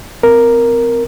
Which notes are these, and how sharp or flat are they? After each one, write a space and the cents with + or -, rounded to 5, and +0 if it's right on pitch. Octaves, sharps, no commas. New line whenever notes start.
C4 -25 A#4 +0